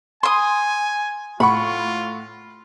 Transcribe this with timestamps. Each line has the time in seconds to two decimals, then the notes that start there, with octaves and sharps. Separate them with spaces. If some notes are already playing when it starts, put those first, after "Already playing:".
0.23 G#5 C6 D#6
1.40 A2 F4 F#5 B5 C#6